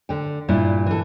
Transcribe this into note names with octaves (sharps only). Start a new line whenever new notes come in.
D3 G5
G2 A#2 E4
E3 A4